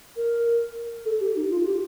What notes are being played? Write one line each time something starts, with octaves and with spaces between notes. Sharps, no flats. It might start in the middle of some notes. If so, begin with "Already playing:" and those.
A#4
A4
G4
D#4
F4
G4